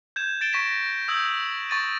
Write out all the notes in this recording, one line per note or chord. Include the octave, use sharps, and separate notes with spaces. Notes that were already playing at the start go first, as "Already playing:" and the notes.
G6 G#6 E7
A6 D7 E7 G7
C#6 A#6 B6 E7
A#6
D#6 E6 G6 G#6 F#7
C#6 A6 D#7